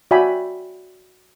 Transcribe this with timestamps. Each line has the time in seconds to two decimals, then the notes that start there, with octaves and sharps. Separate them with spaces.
0.11 F#4 D5 E5 G5 G#5 B5